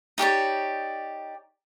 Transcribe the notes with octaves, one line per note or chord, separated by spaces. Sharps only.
D#4 G4 C#5 D5